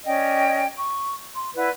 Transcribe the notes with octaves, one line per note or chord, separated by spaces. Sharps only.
C#4 D5 D#5 G5
C#6
C6
E4 B4 D5 F#5